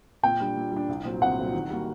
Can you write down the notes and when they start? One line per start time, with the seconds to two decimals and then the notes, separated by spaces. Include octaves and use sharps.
0.23 A#2 G5
0.40 G3 D4
0.56 A#2
0.72 G3 D4
0.89 C2
1.04 A#2 F#3 C4
1.21 C2 F#5
1.38 A#2 F#3 C4
1.54 D#3
1.69 G3 A#3 F#4